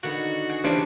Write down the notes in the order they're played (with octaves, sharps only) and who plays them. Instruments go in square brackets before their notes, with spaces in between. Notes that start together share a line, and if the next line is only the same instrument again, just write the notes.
[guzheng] D3 D#3 B3 [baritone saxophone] F#4 [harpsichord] F#5
[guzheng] G#4 [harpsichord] F#5
[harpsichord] C3 E3 C#4 [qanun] D4 [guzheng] C5